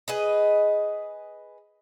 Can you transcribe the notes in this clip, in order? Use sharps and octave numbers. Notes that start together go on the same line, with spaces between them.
G#4 B4 D#5